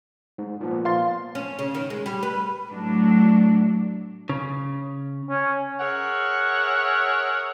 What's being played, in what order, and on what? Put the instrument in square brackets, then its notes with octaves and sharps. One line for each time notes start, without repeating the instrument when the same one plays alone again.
[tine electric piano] G#2
A#2 F3 B3
[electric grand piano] F5 C6 A6
[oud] C#4
C#3
D#3
G#3
G3
B4
[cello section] A2 F#3 A3 D4
[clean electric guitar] C#3
[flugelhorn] C#4
[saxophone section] G#4 A#4 C#5 E5 F#5